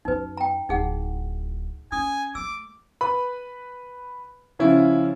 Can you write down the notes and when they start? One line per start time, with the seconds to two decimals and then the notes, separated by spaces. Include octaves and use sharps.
0.05 F#2 C#4 D#4 B4
0.37 G5 A#5
0.69 D1 D#4 G#4 F#5
1.92 C#4 G#5 D#6
2.35 A3 D6 E6
3.01 B4 B5
4.59 C#3 F3 C#4 E4